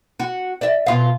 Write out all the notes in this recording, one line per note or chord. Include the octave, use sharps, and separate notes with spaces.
F#4
D5 E5
B2 F4 F5